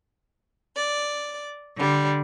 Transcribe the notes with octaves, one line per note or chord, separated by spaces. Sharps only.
D5
D3 G3